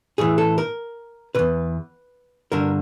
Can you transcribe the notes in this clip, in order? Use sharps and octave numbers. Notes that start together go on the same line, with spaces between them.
A2 E3 G#4
A4
A#4
E2 B2 B4
G2 D3 A#4